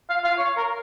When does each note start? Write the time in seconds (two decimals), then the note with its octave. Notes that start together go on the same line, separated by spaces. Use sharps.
0.10 F5
0.24 F5
0.38 C#5
0.57 A#4